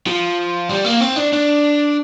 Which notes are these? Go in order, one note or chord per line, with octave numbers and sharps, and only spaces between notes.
F3
G3
A#3
C4
D4
D4